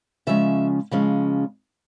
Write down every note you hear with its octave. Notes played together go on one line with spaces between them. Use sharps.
C#3 F3 G#3 C#4 E5
C#3 F3 G#3 C#4